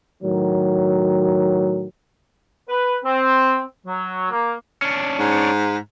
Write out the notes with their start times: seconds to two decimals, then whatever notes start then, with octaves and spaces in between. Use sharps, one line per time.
0.22 A2 D#3 F#3
2.69 B4
3.04 C4
3.86 F#3
4.31 A#3
4.82 C#4 D4
5.19 G#2